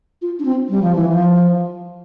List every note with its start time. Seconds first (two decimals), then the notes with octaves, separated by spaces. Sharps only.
0.22 F4
0.39 D4
0.45 C4
0.69 G3
0.82 F3
0.95 E3
1.10 F3